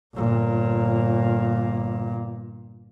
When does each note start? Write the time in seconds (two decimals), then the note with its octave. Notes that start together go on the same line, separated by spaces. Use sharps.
0.14 G1 A#2